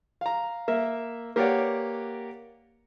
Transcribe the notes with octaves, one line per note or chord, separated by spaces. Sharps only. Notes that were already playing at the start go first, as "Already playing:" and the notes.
F5 A#5
A#3 E5
A#3 G4 B4 C#5 D5 F#5